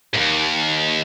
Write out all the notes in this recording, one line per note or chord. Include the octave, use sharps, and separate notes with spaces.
D#2 G#2